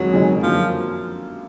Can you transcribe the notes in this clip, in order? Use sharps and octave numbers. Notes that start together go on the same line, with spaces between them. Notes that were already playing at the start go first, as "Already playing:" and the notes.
Already playing: F2 D#3 F#3 G#3 D#4 G#4
F2 D#3 G#3 D#4 G#4
F#2 D3 F3 F#3 A#3 D4